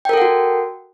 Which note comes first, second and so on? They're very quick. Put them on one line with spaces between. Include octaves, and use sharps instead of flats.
G5 A#4 A4 F#5 F#4